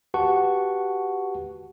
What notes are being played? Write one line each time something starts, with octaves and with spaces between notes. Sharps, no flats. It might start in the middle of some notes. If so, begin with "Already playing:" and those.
F#4 G4 B4 F#5 A5 C#6